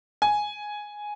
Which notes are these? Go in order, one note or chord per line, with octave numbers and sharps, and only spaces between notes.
G#5